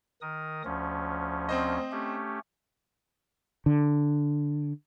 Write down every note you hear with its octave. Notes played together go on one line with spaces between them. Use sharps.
D#3 A#4 D#6
D2 F3 C#4
C4 C5 D#5
A3 C#4 G4
D3